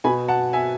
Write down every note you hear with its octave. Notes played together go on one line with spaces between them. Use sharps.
B2 G#5 B5
F#5 A5
E5 G#5